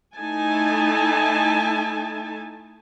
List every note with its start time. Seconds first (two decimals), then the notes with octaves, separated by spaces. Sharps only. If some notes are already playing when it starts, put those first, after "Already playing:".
0.16 A3 D#4 E4 G#5 A5